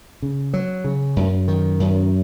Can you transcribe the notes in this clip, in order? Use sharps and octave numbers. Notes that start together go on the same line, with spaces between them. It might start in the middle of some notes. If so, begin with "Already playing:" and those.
C#3
F#3
C#3
F#2
D#3
F#2